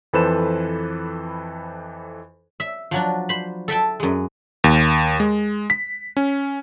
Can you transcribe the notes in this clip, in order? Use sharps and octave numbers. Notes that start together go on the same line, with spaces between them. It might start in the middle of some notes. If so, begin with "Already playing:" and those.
F2 E3 A4 B4 C5 E7
E5
F3 F#3 D4
C5 B5
A4 E5 G5 A5
F#2 G#3
D#2
G#3
B6
C#4